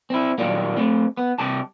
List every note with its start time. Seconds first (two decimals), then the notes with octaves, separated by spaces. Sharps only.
0.10 C4 E4
0.38 A#2 D#3 E3 F#3 G3 A#3
0.77 A3 C4
1.17 B3
1.39 C2 C3 G4 A5